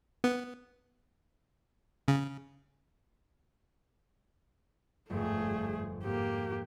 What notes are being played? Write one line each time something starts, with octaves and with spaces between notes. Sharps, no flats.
B3
C#3
G1 F2 G#2 A3 G#4
G#2 A#3 G4